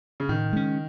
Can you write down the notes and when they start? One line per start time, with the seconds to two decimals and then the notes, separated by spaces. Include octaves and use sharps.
0.20 C#3
0.29 A2 D#3
0.53 G#3 C#4